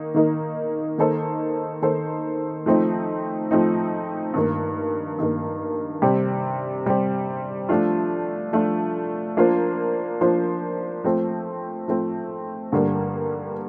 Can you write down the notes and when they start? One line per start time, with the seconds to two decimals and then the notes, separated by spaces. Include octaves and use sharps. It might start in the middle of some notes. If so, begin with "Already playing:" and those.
Already playing: D#3 A#3 D#4
0.14 D#3 A#3 D#4
0.98 D#3 A#3 D#4 A4 C5
1.82 D#3 A#3 D#4 A4 C5
2.66 F3 A3 C4 D#4
3.51 F3 A3 C4 D#4
4.34 G2 D#3 A#3
5.18 G2 D#3 A#3
6.02 C3 G3 C4 G4
6.85 C3 G3 C4 G4
7.69 F3 A3 D4 F4
8.53 F3 A3 D4 F4
9.37 F3 A#3 D4 F4 C5
10.21 F3 A#3 D4 F4 C5
11.04 F3 A3 C4
11.88 F3 A3 C4
12.72 G2 D3 G3 A#3